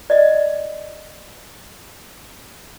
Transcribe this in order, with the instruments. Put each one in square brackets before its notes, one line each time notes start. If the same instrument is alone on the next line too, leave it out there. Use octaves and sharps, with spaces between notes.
[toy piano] D5 D#5